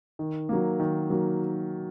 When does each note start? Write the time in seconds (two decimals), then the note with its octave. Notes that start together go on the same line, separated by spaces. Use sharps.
0.19 D#3
0.49 F#3 A#3
0.80 D#3
1.10 F#3 A#3